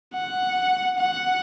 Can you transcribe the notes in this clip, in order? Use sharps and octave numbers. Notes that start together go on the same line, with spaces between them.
F#5
F#5